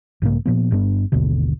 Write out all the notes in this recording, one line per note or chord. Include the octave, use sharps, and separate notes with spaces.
B1 G#2 C#3 A#3
A#2 F3 B3
G1 G2 B3 D4
G#1 D#2 B2 D3